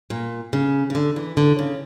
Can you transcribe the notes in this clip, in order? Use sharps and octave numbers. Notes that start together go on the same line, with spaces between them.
A#2
C#3
C#3
D3
E3
D3
C#3